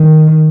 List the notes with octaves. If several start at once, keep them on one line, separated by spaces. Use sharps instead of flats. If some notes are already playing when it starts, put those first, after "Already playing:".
Already playing: D#3